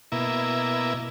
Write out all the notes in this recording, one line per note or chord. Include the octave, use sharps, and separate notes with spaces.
B2 A#3 E4